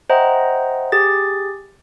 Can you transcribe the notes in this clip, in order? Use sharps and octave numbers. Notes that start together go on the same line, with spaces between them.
C5 D#5 E5 F#5 G5 A#5
G4 G#4 A6